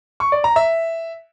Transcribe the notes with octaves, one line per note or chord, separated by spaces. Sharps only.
C#6
D5
A#5
E5